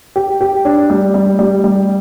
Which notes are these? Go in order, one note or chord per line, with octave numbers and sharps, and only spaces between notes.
G4
G4
D4
G3
G3
G3
G3